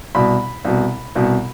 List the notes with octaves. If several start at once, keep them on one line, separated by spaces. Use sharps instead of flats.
C2 B2 B5
C2 B2
C2 B2